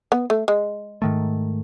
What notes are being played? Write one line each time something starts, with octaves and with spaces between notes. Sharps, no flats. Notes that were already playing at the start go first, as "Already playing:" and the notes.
B3
A3
G#3
G#2 D#3 A3